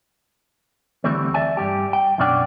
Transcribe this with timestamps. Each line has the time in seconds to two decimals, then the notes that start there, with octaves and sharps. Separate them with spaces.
1.04 D2 E3 G3 A3 C4
1.34 D5 E5 G#5 A5
1.57 G2 G3 G4
1.93 G5
2.18 F#2 B2 C#4 D4 D5 G5